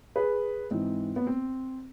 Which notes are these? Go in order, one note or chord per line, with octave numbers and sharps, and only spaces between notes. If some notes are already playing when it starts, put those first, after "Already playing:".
G#4 B4
G#2 E3 C4
B3
C4